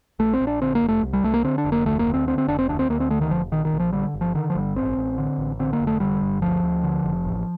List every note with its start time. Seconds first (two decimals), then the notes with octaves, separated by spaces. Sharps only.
0.19 A#1 A3
0.34 C4
0.41 A#1
0.47 D4
0.61 D3 C4
0.75 A#3
0.82 F1
0.88 A3
1.03 C2
1.13 G3
1.24 C2 A3
1.34 A#3
1.44 D3 C4
1.58 D4
1.65 F1
1.72 A#3
1.86 D2 A3
1.99 A#3
2.06 D2
2.14 C4
2.27 D3 C4
2.38 C4
2.48 F1 D4
2.59 C4
2.69 D2 D4
2.79 C4
2.89 D2 A#3
3.00 C4
3.10 D3 A3
3.21 D#3
3.31 F1 F3
3.52 A#1 D#3
3.65 D#3
3.73 A#1
3.80 F3
3.93 D3 G3
4.14 G1
4.21 F3
4.35 D3 D#3
4.50 F3
4.55 G1 G3
4.76 A1 C4
4.97 A1
5.18 D3
5.38 A1
5.60 D3 C4
5.73 A#3
5.80 F1
5.87 A3
6.00 D3 G3
6.21 G1
6.42 D2 F3
6.63 D2
6.84 D3
7.04 F1
7.25 A1